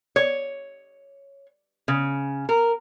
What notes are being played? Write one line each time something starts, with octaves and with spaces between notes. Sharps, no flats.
C#5
C#3
A#4